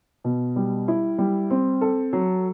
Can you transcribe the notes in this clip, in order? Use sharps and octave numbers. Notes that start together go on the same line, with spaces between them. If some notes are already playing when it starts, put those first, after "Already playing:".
B2
G3
E4
G3
C4
A4
F#3